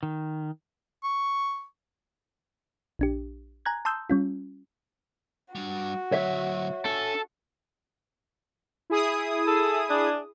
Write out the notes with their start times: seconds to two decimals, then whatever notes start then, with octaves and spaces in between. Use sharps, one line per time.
0.03 D#3
1.04 C#6
2.99 A#1 D4 G4
3.66 G#5 A#5 F#6 G#6
3.85 A5 C6 D#6 E6 G6
4.10 G3 C#4 F4
5.55 G3 D4 F#4
6.12 D3 F#3 C#5 E5
6.85 D4 A4 G#5
8.90 E4 G#4 D#6
9.47 A4
9.90 D4